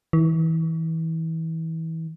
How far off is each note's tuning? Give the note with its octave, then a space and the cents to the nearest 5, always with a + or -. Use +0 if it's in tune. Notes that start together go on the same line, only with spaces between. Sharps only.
E3 -30